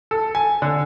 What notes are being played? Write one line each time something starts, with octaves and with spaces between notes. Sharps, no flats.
A4
G#5
D3